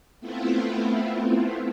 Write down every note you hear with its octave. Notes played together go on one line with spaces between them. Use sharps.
A3 B3 C4 E4 F4